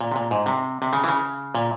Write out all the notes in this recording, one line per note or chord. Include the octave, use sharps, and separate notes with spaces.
A#2
C3
A#2
G#2
C3
C3
C#3
E3
C#3
A#2